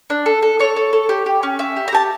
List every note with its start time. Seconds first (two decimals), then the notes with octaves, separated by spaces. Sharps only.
0.10 D4
0.26 A4
0.42 A4
0.59 A4 C#5
0.76 A4
0.93 A4
1.09 G4
1.26 G4
1.43 C#4
1.59 C#4 E5
1.76 G4
1.88 A#5
1.92 G4 A5